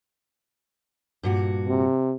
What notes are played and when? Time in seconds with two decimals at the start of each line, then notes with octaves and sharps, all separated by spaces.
1.23 G2 A#2 F#4
1.68 C3